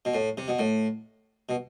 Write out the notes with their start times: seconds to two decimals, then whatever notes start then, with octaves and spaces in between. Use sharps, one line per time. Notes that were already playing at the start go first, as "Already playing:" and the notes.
0.05 B2
0.14 A2
0.38 C3
0.48 B2
0.59 A2
1.49 B2